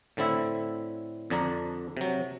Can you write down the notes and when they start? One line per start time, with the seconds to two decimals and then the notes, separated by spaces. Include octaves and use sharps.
0.17 A2 D3 C4 E4 E5
1.30 F2 D3 D4 A#5
1.97 C3 F#3